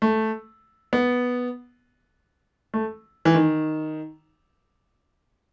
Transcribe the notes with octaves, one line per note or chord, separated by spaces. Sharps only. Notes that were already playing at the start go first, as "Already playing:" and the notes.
A3
B3
A3
E3
D#3